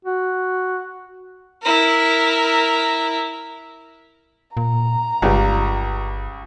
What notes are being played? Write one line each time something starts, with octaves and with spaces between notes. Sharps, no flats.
F#4
E4 A#4
A#2 A#5
G1 C#2 G3 F4